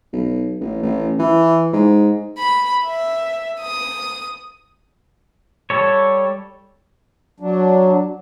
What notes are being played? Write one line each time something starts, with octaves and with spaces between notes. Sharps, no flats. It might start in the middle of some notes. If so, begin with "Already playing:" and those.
B1
A1
A1
E3
G#2
B5
E5
D#6
G3 A4 C#5
F#3 D4